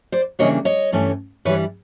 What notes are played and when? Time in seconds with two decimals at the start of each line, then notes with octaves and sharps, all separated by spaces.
0.12 C5 D5
0.39 C#3 E3 G3 A#3 D4 C#5 D#5
0.65 C#5 D#5
0.92 G2 E3 A3 C#4
1.45 G2 E3 G3 B4 C#5